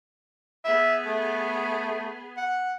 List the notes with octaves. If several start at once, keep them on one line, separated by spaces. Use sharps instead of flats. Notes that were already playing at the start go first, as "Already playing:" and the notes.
B3 G#4 E5
A3
F#5